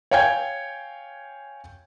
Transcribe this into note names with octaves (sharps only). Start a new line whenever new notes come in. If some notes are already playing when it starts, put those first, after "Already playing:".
C#5 F5 G5 G#5 G#6